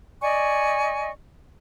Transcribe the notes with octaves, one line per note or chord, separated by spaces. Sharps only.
D5 D#5 G#5 C#6